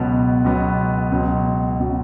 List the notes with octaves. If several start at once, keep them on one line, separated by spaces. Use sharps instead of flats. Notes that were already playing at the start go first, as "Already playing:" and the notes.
Already playing: C#2 B2 F#3 B3
C#2 B2 F#3 B3
C#2 B2 F#3
C#2 B2 F#3